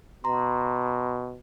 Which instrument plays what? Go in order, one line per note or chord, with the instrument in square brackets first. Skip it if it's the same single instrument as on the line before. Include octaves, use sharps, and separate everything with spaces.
[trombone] B2 [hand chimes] A#5 C6